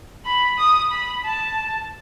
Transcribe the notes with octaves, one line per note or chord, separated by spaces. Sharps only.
B5
D#6
B5
A5